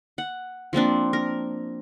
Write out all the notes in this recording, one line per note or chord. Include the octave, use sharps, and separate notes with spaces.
F#5
F3 A#3 C4 D4
A#4